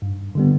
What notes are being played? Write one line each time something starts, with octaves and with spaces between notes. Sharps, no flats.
G2
D3 G3 B3